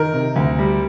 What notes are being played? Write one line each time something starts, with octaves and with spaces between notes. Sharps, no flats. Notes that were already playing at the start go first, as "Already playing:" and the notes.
Already playing: D#3 A#4
C3
D2
G3